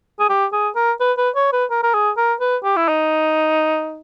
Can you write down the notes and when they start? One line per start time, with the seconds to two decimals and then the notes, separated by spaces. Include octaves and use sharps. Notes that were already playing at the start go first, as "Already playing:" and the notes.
0.20 G#4
0.30 G4
0.52 G#4
0.76 A#4
1.00 B4
1.18 B4
1.35 C#5
1.53 B4
1.71 A#4
1.83 A#4
1.94 G#4
2.17 A#4
2.40 B4
2.64 G4
2.77 E4
2.88 D#4